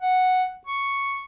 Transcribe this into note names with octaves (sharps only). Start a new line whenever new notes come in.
F#5
C#6